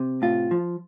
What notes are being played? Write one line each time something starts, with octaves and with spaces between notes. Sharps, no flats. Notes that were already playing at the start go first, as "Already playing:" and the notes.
Already playing: C3
A2 F4
F3